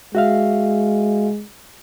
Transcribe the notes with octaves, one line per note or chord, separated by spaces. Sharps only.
G#3 F#4 E5 F5